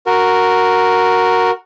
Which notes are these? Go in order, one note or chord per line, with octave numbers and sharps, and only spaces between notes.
F#4 A#4